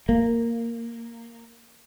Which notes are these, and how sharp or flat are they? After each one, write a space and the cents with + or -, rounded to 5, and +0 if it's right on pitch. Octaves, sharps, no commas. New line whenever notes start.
A#3 -5